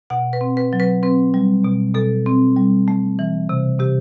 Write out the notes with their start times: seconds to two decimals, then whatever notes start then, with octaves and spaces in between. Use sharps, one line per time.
0.10 B2 F#5
0.33 B4
0.41 C4
0.57 B4
0.73 F#3
0.80 B4
1.03 C4 B4
1.34 G3
1.65 B2
1.95 B2 A4
2.26 C4
2.56 G3
2.88 A3
3.19 E3
3.49 C3
3.79 C3 G4